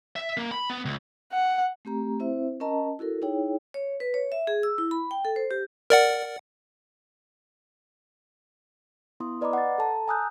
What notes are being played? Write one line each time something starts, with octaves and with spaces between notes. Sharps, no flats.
E5
A#3
B5
B3
C#2
F#5
A3 C4 G4 A#5
C4 E4 C5 E5
C#4 A#4 D#5 A5 A#5
E4 F#4 A4 A#4
D#4 E4 G#4 C#5 G5
C#5
B4
C#5
E5
G#4
E6
E4
B5
G5
A4
C5
G4
A#4 D5 F#5
B3 E4 C6 D#6
B4 D5 D#5 A#5 B5 D6
F#5 A6
A4 A5 A#5
G#5 A#5 D#6 E6 F#6 G6